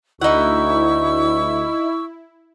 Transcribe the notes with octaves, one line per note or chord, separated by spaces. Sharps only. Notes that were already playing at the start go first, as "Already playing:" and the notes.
D2 D#4 E4 F#5 C#6 E6